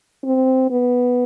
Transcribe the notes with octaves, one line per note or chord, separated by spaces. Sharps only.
C4
B3